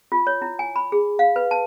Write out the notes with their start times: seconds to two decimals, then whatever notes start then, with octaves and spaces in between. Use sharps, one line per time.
0.12 F4
0.27 C#5
0.42 E4
0.59 G#5
0.76 B5
0.92 G#4
1.19 F5
1.36 B4
1.51 A5